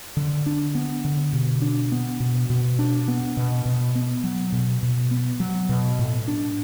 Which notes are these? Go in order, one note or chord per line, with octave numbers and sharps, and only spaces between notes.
D3
D4
B3
D3
B2
D4
B3
B2
B2
D4
B3
B2
B2
B3
F#3
B2
B2
B3
F#3
B2
A2
D4